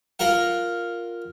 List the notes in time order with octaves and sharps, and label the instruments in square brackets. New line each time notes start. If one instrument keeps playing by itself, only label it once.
[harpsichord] F4 A#4 F#5